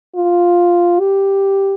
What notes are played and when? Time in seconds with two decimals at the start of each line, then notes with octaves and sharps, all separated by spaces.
0.15 F4
0.99 G4